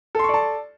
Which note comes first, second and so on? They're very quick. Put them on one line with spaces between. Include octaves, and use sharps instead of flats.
A4 C6 C#6 D5 A5